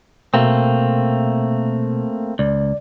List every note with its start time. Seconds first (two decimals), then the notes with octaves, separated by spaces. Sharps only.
0.34 B2 A3 A#3 C4
2.39 C#2 D5